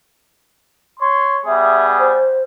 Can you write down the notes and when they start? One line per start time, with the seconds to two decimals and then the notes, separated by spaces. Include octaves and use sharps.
1.00 C#5 C6
1.46 G3 B3 G#4 E5
1.99 C5